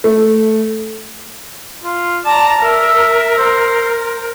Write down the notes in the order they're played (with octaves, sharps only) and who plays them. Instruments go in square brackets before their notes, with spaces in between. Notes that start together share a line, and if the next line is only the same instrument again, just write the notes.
[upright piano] A3
[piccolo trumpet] F4
[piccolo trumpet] D5 [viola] A5 A#5
[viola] A#4 [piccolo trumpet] E5
[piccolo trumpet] C5